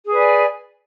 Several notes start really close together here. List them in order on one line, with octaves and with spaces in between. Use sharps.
G#4 B4 D5 G#5